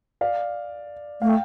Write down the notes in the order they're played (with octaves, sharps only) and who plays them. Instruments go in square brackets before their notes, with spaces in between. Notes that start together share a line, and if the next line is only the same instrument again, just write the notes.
[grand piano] D5 F5
[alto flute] A3 [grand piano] F5
[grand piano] G5